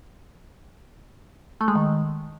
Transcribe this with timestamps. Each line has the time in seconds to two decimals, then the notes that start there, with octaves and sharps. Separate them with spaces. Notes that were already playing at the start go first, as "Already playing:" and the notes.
1.61 A3
1.68 G#3
1.75 D#3